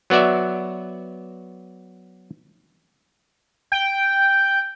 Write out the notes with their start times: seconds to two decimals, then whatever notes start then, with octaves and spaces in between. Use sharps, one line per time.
0.10 F#3 B3 F#4 D5 E5
3.72 G5